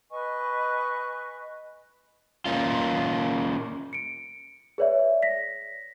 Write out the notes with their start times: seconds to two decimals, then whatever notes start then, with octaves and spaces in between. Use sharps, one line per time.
0.10 B4 D#5 G#5 C#6
2.46 A#3 C#4 F4
3.93 C#7 D7
4.78 G#4 B4 C#5 D5 E5
5.23 A#6 B6